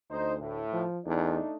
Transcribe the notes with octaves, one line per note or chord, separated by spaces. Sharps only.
D2 D#4 C5
A2
F3
E2 A3 D4 D#4